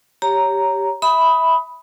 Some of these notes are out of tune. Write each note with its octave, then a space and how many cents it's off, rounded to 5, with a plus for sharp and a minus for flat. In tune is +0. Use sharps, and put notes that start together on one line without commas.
G4 +0 C#5 +0 A#5 +0
E5 -20 B5 +0 D#6 +15